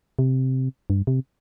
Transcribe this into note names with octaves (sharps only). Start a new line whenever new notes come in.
C3
G2
C3